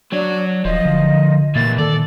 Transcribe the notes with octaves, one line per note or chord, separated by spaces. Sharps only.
F#3 D4 C#5
D#1 F3 D#5
D3
A#2 E3 A#3 A6
D#3 A4 D5